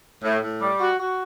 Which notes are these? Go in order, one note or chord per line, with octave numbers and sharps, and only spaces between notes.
A2
A2
G3
F#4
F#4